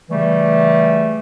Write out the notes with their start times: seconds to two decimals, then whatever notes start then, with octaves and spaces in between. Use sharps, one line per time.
0.10 C#3 E3 G3 A3